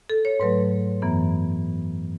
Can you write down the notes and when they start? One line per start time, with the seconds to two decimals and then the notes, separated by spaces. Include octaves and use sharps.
0.10 A4
0.25 C#5
0.40 G#2 F#3 A3 B4
1.02 F#2 E3 B3